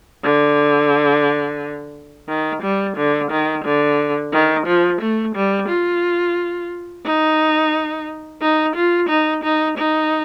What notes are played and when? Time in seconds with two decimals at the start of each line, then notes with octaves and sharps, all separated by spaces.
0.24 D3
2.28 D#3
2.62 G3
2.97 D3
3.31 D#3
3.65 D3
4.33 D#3
4.66 F3
5.01 A3
5.35 G3
5.68 F4
7.06 D#4
8.42 D#4
8.76 F4
9.09 D#4
9.44 D#4
9.78 D#4